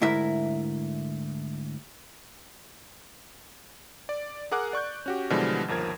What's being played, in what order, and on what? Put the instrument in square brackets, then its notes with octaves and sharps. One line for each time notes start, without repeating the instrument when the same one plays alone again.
[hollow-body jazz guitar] D2 G#2 E4 A#4 E5
[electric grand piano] D5
G#4 A#4 F#5 D6 F#6
D5 C#6 F#6 G6
C#4 F#4 G4
B2 D3 E3 F3 G3 G#3
G1 D#2 F3 A#4 G#6